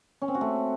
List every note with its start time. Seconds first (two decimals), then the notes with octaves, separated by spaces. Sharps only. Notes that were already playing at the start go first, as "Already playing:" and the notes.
0.22 C#4
0.28 C4
0.35 F#4
0.41 A3